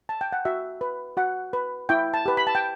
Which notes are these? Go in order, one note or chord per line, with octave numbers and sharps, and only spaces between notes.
A5
G5
F#5
F#4 E5
B4
F#4 F#5
B4
E4 G5
A5
G4 B4
B5
A5
G5